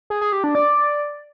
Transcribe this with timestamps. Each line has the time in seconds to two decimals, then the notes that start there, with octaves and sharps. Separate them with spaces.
0.10 G#4
0.21 G#4
0.33 G4
0.44 D4
0.55 D5